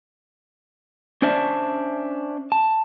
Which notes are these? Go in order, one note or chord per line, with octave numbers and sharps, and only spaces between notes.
C#4 D4 C5 D5 E5 A5
A5